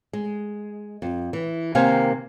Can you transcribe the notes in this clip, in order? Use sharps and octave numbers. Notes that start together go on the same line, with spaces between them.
G#3
F2
E3
C3 D#3 A#3 C5 F5 G#5